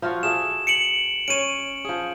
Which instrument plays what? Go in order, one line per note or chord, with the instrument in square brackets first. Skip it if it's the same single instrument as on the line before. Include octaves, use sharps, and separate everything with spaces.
[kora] F3 F4 F#4
[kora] G#4 A4 E5 [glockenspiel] E7
[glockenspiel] C#7 D7 F#7
[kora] C#4 C#5 [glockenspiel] D7 D#7
[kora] F3 G#4